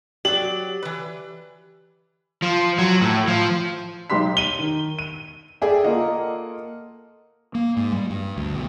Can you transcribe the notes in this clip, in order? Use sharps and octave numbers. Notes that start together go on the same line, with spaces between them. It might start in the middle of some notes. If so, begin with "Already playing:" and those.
F#3 G4 D5 F#7
E3 B4
F3
F#3
A2
F3
B1 D#4 G4 C6 B6
D#7 G7
D#3
D#7
G#4 A4 D5 E5 G5
A#3 F4 A4 D#5 F#5
A#3
G#2
G3
G2
D2
B1